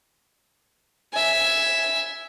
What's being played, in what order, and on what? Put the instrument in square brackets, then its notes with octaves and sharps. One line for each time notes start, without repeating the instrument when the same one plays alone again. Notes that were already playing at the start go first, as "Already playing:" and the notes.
[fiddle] E5 G#5